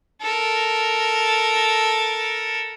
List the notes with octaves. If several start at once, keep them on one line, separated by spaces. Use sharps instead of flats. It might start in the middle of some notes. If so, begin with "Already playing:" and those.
A4 A#4